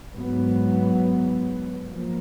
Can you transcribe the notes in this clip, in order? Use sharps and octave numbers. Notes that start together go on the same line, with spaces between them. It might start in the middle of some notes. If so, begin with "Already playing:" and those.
G#2 F#3 B3
F3 A#3